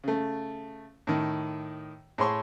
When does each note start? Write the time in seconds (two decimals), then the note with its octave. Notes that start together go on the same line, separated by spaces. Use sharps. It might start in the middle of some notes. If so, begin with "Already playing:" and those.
0.04 C#3 A3
1.07 A2 D#3
2.18 A2 G#4 C#5 C6 C#6